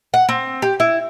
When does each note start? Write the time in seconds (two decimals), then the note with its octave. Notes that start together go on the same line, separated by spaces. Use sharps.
0.14 F#5
0.29 C4
0.62 G4
0.80 E4